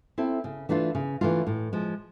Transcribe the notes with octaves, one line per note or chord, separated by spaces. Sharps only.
C4 E4 A4
C#3
E3 A3 D4 F4
C#3
E3 A3 D4 F4
A2
F3 G#3